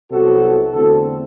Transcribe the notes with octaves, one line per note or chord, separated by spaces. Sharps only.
C2 C3 F#3 B3 F#4 A4
E2 D3 A3 C4 F#4 A4